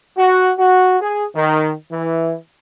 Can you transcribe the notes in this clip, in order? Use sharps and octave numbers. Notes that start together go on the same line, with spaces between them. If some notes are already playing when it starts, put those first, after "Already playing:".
F#4
F#4
G#4
D#3
E3